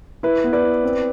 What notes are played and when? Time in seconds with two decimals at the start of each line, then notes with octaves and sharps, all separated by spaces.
0.23 E4 B4
0.44 B3
0.53 B4 D5
0.64 E4
0.83 C4